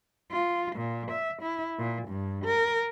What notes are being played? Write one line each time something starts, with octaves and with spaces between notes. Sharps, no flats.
F4
A#2
E5
E4
A#2
G2
A#4